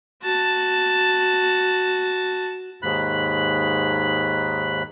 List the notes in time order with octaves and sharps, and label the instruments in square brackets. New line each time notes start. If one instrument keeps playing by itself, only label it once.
[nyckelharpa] F#4 A5
[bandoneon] D#2 G#2 B5 F#6